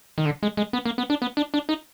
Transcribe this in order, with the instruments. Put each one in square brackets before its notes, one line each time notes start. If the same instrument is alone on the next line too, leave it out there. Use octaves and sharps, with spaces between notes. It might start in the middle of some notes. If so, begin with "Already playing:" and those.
[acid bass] D#3
D3
G#3
G#3
B3
A#3
B3
D4
B3
D4
D4
D#4